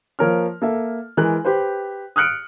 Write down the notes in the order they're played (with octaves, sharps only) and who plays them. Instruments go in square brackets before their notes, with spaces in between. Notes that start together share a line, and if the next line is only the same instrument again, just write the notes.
[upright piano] F3 A#3 A#4 C#5 F6
A#3 A4 E5
E3 G#3 A#4 F#6
G4 B4 C5
D#6 F6 F#6 C#7 D7